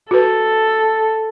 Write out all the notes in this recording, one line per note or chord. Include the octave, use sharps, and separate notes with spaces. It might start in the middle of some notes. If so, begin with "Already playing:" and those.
F#4 A4 B4